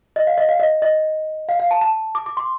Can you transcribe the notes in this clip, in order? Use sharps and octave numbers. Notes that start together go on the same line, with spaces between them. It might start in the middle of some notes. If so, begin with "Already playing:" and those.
D#5
F5
D#5
F5
D#5
D#5
F5
F5
A5
A5
D6
D6
C6